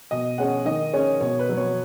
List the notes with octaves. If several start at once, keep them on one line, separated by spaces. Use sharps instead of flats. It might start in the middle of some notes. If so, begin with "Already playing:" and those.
B2 D#5
G#3 C#4 F#5
D#3 D#5
G#3 C#4 C#5
B2 C#5
B4
F#3 B3
C#5